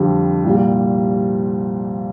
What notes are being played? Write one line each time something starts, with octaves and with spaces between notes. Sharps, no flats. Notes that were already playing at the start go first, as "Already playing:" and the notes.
Already playing: F2 D3 G3
C2 A#2 G3